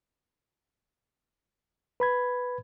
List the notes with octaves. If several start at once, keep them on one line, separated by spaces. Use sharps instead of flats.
B4 B5 G#6